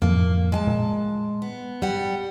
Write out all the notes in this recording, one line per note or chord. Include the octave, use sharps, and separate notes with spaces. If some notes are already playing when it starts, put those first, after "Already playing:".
F2 A2 F3 A#3
G#3 G#5 A5
A#2
B3
G3 F#5